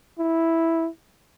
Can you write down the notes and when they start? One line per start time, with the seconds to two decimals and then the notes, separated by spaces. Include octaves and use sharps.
0.19 E4